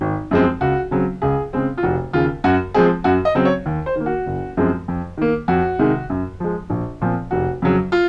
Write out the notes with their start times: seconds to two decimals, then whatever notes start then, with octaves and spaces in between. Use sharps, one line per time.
0.01 G#1
0.31 F#2 F3 G#3 C4
0.61 C#2 F#4
0.91 C#3 F#3 C4
1.22 C#2 G#4
1.53 C#3 G#3 C4
1.78 F4
1.83 F1 F#4
2.13 D#2 C#3 F4
2.44 F#2 F#4
2.74 F3 G#3 C4 G#4
3.04 F#2 F#4
3.25 D#5
3.35 C#3 F#3 C4
3.45 C#5
3.66 D#2
3.86 C5
3.96 D#3 A#3
4.06 F#4
4.26 F#1
4.57 F#2 F3 G#3 C4
4.88 F2
5.17 D#3 A#3
5.48 F2 F#4
5.79 C3 D#3 G#3
6.10 F#2
6.40 F3 G#3
6.70 A#1
7.01 A#2 F3 C4
7.31 F1 F#4
7.62 F2 C#3 F#3
7.92 F4